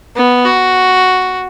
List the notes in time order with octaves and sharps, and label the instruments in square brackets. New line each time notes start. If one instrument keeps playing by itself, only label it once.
[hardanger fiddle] B3
F#4